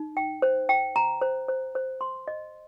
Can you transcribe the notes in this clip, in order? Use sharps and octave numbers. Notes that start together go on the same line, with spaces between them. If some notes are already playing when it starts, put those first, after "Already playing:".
Already playing: D#4
G5
C5
G5
A#5
C5
C5
C5
C6
D#5